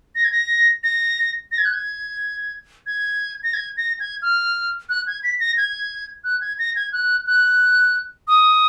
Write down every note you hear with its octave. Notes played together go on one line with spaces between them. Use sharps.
A#6
G#6
A#6
A#6
A#6
G#6
F#6
G#6
G#6
A#6
G#6
A#6
G#6
F6
F#6
G#6
B6
A#6
G#6
F#6
G#6
A#6
G#6
F#6
F#6
D#6